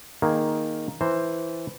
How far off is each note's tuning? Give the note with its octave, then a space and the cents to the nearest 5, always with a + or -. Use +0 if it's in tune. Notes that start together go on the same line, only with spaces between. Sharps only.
D#3 +0 A#3 +0 G#4 +0
E3 +0 C5 +0 A#5 -30